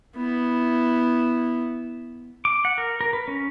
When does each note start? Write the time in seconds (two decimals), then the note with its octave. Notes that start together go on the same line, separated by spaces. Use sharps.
0.17 B3 E4
2.45 D6
2.65 F#5
2.78 A#4
3.01 A#4
3.13 B4
3.28 C#4